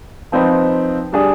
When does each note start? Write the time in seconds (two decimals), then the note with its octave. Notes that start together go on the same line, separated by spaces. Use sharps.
0.32 F3 C4 D#4 B4
1.13 G3 D4 G#4